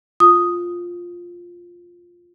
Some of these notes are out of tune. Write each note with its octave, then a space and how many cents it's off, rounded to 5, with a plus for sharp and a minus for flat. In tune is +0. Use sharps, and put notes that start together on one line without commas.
F4 +5 D#6 +0